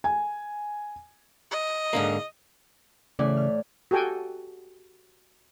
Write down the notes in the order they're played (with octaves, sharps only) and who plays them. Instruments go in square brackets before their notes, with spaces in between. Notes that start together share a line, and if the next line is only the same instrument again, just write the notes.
[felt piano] G#5
[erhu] D#5
[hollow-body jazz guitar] G#2 D3 A#3
[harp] A2 E3 D5 [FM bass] C#3
[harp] F6
[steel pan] F#4 G4 A4 G5 G#5